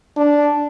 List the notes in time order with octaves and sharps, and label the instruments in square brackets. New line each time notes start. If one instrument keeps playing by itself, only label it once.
[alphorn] D4